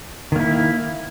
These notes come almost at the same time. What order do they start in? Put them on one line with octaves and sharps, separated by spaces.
D#3 A#3 E4